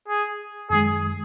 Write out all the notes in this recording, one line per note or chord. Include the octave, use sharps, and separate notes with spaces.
G#4
F#2 D#3 G#3 G#4